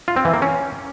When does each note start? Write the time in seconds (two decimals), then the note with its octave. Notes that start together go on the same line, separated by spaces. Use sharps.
0.08 F4
0.16 C4
0.25 E3
0.34 A#3
0.42 C#4